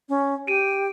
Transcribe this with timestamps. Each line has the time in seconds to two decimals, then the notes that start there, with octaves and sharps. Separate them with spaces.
0.09 C#4
0.47 G4 D7 D#7